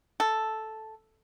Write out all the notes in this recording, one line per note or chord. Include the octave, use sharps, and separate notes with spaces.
A4